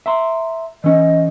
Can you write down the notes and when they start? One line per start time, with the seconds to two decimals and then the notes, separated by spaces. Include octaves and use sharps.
0.06 E5 A#5 C6
0.84 E3 C#4 D#5